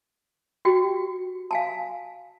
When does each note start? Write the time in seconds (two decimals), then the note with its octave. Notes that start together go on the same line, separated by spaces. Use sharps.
0.65 F#4 G4 G5
1.51 F5 G#5 A5